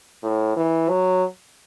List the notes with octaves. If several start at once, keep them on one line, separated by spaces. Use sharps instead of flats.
A2
E3
F#3